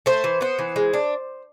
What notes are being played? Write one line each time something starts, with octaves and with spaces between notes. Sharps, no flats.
A3 C5
E3
B3 C5
E3
G#3
D4